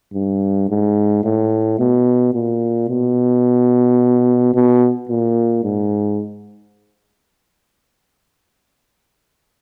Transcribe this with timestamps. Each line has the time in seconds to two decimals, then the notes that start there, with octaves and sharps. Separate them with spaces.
0.14 G2
0.69 G#2
1.24 A2
1.79 B2
2.34 A#2
2.89 B2
4.54 B2
5.09 A#2
5.64 G#2